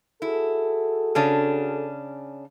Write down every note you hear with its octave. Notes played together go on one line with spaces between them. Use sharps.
E4 F#4 G#4 A4
C#3 C#4 D4